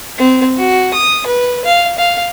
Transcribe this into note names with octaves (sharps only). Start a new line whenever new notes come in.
C4
F#4
D#6
B4
F5
F5